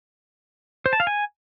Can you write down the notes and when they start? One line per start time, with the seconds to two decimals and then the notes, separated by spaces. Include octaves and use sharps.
0.86 C5
0.93 A5
1.00 F5
1.07 G#5